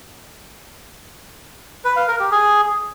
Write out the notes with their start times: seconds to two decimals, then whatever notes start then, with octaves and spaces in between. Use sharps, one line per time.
1.85 B4
1.96 F5
2.08 A#4
2.20 G4
2.31 G#4